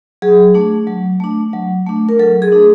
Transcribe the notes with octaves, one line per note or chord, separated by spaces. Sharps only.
F#3 G#4
A3 D4
F#3
A3 D4
F#3
A3 D4
A#4
F#3 A4
G#4
A3 D4